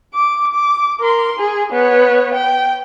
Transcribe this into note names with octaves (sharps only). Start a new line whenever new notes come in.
D6
D6
A#4 C6
G#4
B3 C#5
G5